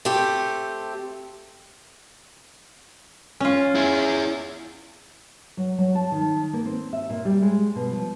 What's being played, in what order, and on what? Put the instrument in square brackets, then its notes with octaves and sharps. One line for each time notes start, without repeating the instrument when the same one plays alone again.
[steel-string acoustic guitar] A3 C4 G4
[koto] C#4 F4
[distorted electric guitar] E4 G#4
[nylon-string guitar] F#3
F#3
A5
D#3
A#3
C4
E5
A#2
G3
G#3
B2
F3